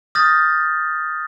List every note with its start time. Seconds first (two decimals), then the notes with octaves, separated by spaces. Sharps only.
0.15 D#6 F6 G6 A6 A#6